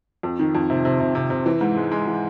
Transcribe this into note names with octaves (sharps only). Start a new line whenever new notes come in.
F2
D#3
F2
C3
C3
C3
C3
C3
E3
G#2
G#3
G#3
E3